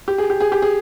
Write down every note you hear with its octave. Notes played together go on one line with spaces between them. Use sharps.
G4
G#4
G4
G#4
G4
G#4